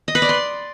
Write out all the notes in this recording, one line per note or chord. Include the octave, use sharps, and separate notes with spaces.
D#5
B4
D5
C6